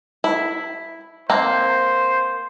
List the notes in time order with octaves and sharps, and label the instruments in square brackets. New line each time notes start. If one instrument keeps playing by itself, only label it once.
[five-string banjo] E4
[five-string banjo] A#3 C4 [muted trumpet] C5